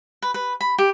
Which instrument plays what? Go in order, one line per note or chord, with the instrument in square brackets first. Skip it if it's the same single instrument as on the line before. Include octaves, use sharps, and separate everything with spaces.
[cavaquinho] B4
B4
B5
G4